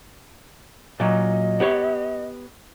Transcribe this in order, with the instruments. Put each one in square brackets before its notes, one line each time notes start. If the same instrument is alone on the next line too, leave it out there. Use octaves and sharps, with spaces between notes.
[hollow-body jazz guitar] A#2 F#3 [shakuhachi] D#5
[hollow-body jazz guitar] B3 G4 C#5